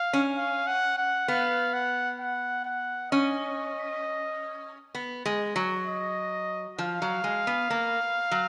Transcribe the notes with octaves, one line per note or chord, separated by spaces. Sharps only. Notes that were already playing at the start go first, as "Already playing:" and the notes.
Already playing: F5
C#4
F5
F#5
F#5
B3 F5
F#5
F#5
F#5
C#4 D#5
B3
G#3
F#3
D#5
F3 F5
F#3
G#3
B3
A#3
F#3